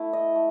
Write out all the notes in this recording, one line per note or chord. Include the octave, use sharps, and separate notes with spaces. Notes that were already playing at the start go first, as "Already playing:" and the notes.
Already playing: A3 E4
D#5
A3